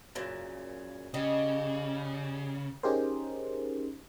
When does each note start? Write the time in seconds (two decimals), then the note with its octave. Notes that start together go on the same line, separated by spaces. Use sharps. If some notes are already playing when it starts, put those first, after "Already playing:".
0.15 F#2 A#2 C#3
1.14 C#3 G3 D#5
2.83 C#4 D#4 G4 G#4 A#4 C5